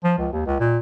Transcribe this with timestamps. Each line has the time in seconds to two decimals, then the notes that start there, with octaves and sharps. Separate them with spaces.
0.04 F3
0.18 C#2
0.33 D#2
0.46 C#2
0.60 A#2